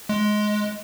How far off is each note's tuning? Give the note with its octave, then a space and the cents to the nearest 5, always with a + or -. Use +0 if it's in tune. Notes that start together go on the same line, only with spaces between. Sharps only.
G#3 +15